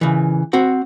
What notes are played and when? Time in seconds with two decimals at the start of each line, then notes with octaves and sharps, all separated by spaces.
0.01 C#3 E3
0.53 C4 F#4 F#5